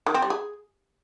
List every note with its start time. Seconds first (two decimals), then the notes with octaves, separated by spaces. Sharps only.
0.06 D#3
0.14 C4
0.22 G3
0.30 G#4